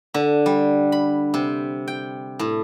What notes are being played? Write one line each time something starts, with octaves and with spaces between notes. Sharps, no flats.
D3
G3
B5
C3
G5
A2